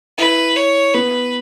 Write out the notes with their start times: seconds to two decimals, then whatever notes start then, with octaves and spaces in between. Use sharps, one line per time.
0.18 E4 B4
0.56 C#5
0.94 B3 B4